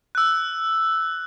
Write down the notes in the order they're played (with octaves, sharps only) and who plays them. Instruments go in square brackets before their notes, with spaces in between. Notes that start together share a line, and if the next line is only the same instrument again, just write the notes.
[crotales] E6 F#6